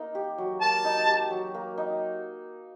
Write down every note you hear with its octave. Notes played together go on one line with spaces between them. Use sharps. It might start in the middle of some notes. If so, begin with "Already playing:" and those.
Already playing: A#3 D#4
G4
F#3
A#3 A5
D#4
G4
F#3
A#3
D#4